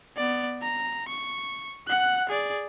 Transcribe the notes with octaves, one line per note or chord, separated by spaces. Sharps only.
B3 D5
A#5
C#6
F#5 F#6
G#4 D5